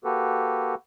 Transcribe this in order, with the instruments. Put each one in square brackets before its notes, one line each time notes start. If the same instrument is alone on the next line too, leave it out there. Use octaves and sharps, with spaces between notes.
[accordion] A#3 F#4 G4 A4 B4